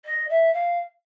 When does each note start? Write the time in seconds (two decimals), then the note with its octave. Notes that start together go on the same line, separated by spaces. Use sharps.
0.05 D#5
0.29 E5
0.53 F5